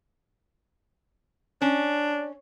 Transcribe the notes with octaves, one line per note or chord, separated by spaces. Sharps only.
C#4 D4